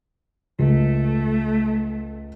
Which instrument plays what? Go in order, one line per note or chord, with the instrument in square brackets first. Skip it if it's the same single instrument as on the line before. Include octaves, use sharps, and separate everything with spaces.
[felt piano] C#2 [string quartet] A3